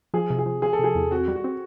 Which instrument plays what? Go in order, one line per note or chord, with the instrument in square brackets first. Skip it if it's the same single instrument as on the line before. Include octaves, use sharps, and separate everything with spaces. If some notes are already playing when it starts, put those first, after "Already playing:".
[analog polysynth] F3 [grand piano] G#4
[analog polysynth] C3
[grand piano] G#4
[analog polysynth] F3
[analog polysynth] F3 [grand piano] G#4
[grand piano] A4
[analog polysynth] C3 [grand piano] G#4
[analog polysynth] E2
[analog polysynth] C4 [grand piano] F#4
[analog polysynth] G3
[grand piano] F#4
[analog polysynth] C4